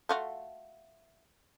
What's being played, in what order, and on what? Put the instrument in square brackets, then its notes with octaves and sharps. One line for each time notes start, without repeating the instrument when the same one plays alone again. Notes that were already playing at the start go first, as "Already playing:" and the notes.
[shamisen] A3 F4 F#4